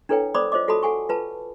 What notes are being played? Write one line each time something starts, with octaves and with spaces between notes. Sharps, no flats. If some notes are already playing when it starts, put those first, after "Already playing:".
D4 E4 A4 B4 C#5 G5
C5 D5 B5 D6 D#6
F4 C5 C#5 D#5 D6
F4 F#4 A4 A5 B5 D#6
A4 F#5 G#5 C#6
F4 B4 A5 B5